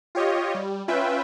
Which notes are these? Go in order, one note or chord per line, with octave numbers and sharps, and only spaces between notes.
F4 G4 C#5 D#5
G3
C#4 F4 B4 E5 G5